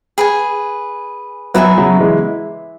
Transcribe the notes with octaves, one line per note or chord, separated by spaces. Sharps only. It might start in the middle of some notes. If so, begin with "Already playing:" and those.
G#4 B4 G#5
F#3 B3 E4 B4 E5 G#5
C#3 F#3
E3 G#3